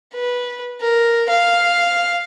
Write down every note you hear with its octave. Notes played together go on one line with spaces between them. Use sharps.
B4
A#4
F5